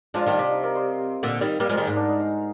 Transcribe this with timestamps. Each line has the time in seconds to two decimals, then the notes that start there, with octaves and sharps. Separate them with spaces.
0.14 F3 G#3 D4 F4
0.26 D#3 G3 D4 F4
0.39 C3 D4
0.51 D#4
0.63 A#4 D5
0.75 C5 D#5
1.23 A#2 D3
1.41 D#3 G3
1.60 G3 A#3 A#4 D5
1.69 F3 G#3
1.77 D#3 G3 G#4 C5
1.87 G#2
1.96 D4
2.09 D#4
2.20 D#4